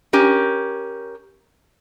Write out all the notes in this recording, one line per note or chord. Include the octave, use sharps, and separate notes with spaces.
C#4 G4 A#4